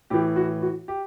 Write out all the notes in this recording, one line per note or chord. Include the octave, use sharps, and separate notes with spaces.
A2 E3 G4
F#4
F#4
G4